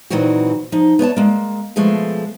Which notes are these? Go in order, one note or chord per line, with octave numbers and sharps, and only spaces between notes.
A#2 D#3 E3 F#3 C4 F#4
F3 D#4
B3 C#5 D#5 A5
G#3 A#3
B2 F3 G#3 A3